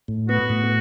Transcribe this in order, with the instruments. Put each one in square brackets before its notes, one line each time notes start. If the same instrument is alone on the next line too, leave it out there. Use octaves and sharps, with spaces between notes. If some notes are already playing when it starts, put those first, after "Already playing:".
[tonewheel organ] A2
[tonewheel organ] B3 [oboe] F#4
[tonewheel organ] A2